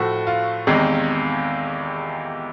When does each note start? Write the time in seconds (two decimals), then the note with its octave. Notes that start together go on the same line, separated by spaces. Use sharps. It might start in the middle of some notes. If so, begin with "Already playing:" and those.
Already playing: A2 F3 A3 F#4
0.27 F4
0.67 E2 C3 D#3 G#3